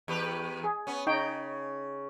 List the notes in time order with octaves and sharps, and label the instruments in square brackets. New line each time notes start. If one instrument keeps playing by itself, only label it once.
[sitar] E2 G4 B4
[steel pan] G#4
[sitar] B3 C#4
[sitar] C#3 [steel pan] D#4 C#5 G5